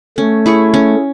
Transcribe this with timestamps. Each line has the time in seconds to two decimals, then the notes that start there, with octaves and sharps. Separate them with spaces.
0.18 A3 C#4
0.46 E4 G#4 C#5
0.74 C#4